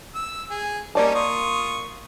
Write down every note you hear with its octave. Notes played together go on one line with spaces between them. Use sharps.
E6
G#4
G3 A#3 C#4 D#4 D5 A5
F4 C#6 D#6